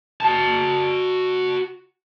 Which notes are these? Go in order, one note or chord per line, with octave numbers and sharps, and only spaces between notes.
F#4 A5